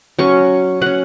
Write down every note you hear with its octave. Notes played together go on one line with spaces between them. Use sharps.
F#3 C#4 C#6
F#3 C#4 F#5